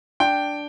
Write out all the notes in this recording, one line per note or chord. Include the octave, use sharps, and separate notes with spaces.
D4 G5